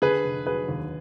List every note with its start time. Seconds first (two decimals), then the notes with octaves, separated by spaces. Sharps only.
0.02 D3 G#4 B4
0.24 F1
0.46 F#3 G#4 B4
0.69 D#2